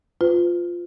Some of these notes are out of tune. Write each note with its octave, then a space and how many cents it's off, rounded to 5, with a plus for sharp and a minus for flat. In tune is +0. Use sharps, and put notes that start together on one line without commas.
F4 +0 B4 +40